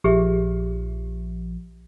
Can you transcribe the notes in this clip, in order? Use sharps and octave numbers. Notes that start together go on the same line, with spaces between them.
A#1 F3 G4 G#4 E5